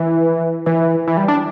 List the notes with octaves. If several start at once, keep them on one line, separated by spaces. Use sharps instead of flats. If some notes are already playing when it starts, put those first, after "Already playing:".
Already playing: E3
E3
E3
G3
D4